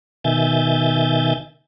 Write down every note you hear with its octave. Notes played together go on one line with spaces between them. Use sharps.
B2 D#3 E5 G#5 G6 A6